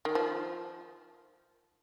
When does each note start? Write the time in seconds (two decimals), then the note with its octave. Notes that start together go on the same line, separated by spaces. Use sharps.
0.05 D#3
0.15 F3